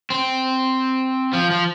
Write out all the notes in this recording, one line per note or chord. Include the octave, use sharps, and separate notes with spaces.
C4
F3
F3